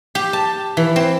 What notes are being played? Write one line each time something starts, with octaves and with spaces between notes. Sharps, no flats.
G4
A5
E3
C4